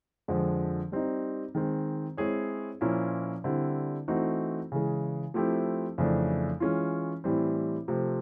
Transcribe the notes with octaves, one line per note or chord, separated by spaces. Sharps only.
F2 D3 F3 G#3
G3 C4 D#4
D#3 G#3 C4
G#3 C4 E4 G#4 C#5
A#2 F3 A#3 C#4 E4
D3 G3 C4 E4
E3 A3 C4 D#4 F#4
C#3 E3 G#3
F3 A3 C4 E4 G4
F2 C#3 E3 A3 D4
E3 G#3 C#4 F4
A2 E3 G3 C4
C3 F3 A3 C4